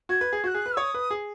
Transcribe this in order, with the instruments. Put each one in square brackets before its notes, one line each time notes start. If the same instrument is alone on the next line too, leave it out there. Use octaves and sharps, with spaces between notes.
[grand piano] F#4 [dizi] G#6
[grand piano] B4
G#4
[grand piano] F#4 [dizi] G#6
[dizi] F#6
[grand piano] G#4
B4
[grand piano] C#5 [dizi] D#6
[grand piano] B4
G#4